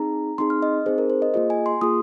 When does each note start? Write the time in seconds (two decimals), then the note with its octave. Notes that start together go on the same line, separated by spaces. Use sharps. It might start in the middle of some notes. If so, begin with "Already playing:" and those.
Already playing: C4 D#4 G#4 A#5
0.38 C4 D#4 G#4 C6
0.50 F6
0.62 D#5
0.86 C4 D#4 G#4 C5
0.98 A#4
1.10 C5
1.22 D#5
1.34 A#3 F4 G#4 D#5
1.50 G#5
1.66 C6
1.81 A#3 F4 G#4 D#6